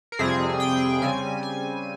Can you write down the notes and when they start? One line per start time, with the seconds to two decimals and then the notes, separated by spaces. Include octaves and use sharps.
0.12 A#4
0.19 F2 C3 G3 C4 G#4
0.60 G5
1.02 C#3 G3 C4 G#5
1.43 G#5